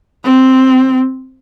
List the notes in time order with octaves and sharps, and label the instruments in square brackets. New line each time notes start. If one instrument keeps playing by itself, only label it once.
[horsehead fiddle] C4